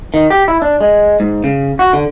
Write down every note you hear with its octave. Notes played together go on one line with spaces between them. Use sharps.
D#3
G4
E4
D4
G#3
G#2
C#3
F#4
D3